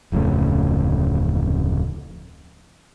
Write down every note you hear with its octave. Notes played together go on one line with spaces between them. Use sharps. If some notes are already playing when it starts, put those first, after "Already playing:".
D1 F2 C#3 A3